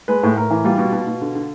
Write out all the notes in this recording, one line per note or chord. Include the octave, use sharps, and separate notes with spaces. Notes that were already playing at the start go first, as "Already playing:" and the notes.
G#3 B4
A2
A2 A#4
E3
G3 F4
B2
B2
B2
D3
D3